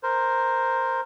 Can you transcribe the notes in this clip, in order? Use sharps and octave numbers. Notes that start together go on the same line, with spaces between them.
A#4 C5